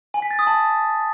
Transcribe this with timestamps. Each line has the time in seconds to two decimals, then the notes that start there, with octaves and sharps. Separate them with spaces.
0.14 G#5
0.22 B6
0.31 A6
0.39 D#6
0.47 A5